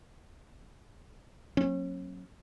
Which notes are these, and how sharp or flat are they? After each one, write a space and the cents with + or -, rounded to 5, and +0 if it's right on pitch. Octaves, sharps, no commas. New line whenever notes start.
F#3 -15 A#3 -5 C#4 -35